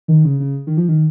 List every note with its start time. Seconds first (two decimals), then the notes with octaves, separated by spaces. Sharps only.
0.08 D#3
0.25 C#3
0.40 C#3
0.67 D#3
0.77 F3
0.88 D#3